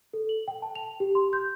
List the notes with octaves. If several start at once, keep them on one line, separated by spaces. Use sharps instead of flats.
A4
F#7
G5
A5
F7
G4
C6
G6